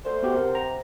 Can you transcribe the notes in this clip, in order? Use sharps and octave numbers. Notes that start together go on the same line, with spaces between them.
D2 C5 C6
B3 F#4 G4 F#5
C3 A#4
A#5